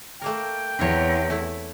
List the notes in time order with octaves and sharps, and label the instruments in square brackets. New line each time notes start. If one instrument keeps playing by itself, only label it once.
[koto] A3 A#3 A#4 [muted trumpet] G5
[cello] E2 [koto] C4 A#4 C#5
[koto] A3 E4